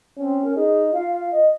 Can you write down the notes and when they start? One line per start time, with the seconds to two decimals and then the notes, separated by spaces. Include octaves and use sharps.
0.17 C4 C#4
0.44 A#4
0.55 D#4 G#4
0.93 F4 F5
1.12 F5
1.31 D#5